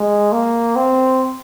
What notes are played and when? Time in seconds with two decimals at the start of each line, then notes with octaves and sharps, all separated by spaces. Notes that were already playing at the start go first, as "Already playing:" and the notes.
Already playing: G#3
0.32 A#3
0.76 C4